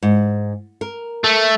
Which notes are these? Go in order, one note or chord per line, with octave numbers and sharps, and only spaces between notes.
G#2
A#4
A3